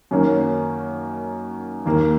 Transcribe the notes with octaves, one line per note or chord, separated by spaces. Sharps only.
F#2 D#3 A#3 C#4
D#2 D#3 A#3